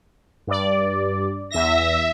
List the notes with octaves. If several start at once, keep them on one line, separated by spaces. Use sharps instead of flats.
G2 D5
E2 E5 A#6